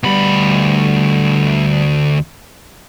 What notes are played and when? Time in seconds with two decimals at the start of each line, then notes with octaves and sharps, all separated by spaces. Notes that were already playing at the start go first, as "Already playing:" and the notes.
0.03 D2 G3 B3 B5